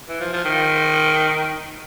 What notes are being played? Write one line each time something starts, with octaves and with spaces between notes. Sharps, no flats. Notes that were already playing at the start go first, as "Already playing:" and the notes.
E3
F3
F3
D#3